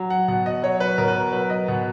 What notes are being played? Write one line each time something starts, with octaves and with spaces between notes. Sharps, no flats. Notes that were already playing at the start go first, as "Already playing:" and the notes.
Already playing: F#3
F#5
B2 F#5
D#5
F#3 C#5
B4
B2 A#4
B4
A#4
F#3 B4
D#5
B2 F#5